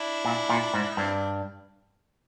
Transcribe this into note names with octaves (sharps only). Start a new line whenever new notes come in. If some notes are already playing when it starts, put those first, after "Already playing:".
Already playing: D4 E4
A#2
A#2
G#2
D#4
G2 C4 D4